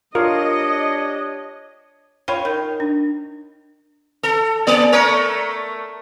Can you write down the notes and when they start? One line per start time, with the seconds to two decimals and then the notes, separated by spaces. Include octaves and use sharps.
0.15 D4 F4 G4 A#4 C#5 D#5 F5
2.28 F4 C#5 G5 B5
2.45 D#3
2.80 D4
4.23 A4
4.67 A#3 D5
4.92 A3 A#4 C#5